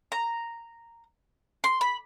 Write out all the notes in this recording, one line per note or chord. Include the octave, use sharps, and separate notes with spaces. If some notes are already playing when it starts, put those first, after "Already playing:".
A#5
C6
B5